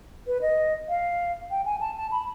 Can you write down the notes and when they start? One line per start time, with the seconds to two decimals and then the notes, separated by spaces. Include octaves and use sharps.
0.27 B4
0.42 D#5
0.89 F5
1.51 G5
1.65 G#5
1.81 A5
1.97 A5
2.11 B5